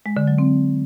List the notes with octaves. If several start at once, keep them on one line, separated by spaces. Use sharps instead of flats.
G#3
D3
F#3
C4